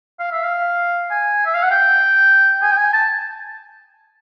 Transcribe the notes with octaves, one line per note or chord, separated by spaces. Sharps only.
F5
E5
F5
G#5
E5
F5
F#5
G5
G#5
G5
G#5
A5